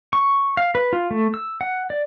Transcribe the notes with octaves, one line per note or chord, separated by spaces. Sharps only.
C#6
F5
B4
F4
A3
E6
F#5
D5